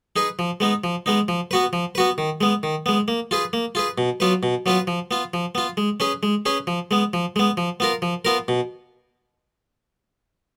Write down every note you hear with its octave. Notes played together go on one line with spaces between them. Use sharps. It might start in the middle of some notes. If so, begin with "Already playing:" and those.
D#4 G#4 B4
F3
G#3 B3 D#4
F3
G#3 B3 D#4
F3
B3 F#4 B4
F3
B3 F#4 B4
D#3
G#3 B3
D#3
G#3 B3
A#3
F4 G#4 B4
A#3
F4 G#4 B4
B2
F#3 B3 F4 B4
B2
F#3 B3 F4 B4
F3
B3 F4
F3
B3 F4
G#3
C#4 G#4 B4
G#3
C#4 G#4 B4
F3
G#3 B3
F3
G#3 B3
F3
B3 F4 A#4
F3
B3 F4 A#4
B2